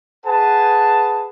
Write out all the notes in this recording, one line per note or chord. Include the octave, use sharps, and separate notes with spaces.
G#4 B4 F#5 G#5 A5